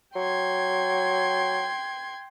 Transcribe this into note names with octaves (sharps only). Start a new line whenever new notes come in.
F#3 G5 C6 G#6